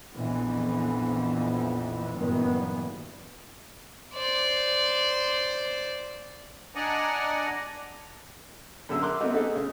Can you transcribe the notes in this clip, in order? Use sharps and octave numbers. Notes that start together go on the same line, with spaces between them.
A#1 F2 E3 B3
F#1 G2 A#2 D#3 E3 B3
C5 D5
D4 D5 D#5 F#5 G#5 A#5
F#2 D3 G#4 E6
A#4 C6 D6 F#6
A3 B3 C4 D#4 F#4
A3 B3 C4 D#4 G#4 A4
C#3